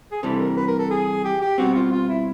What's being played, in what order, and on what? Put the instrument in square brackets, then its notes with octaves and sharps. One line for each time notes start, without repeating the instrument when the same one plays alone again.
[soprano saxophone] G#4
[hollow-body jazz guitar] C3 E3 G3 [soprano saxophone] A4
[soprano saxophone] A#4
B4
A#4
A4
G#4
G4
G4
[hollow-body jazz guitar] B2 G3 C4 [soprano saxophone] F#4
[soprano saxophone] F4
F4
E4